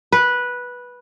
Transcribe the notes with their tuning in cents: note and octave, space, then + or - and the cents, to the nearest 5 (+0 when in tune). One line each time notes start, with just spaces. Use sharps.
B4 -10